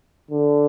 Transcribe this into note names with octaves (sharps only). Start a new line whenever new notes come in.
D3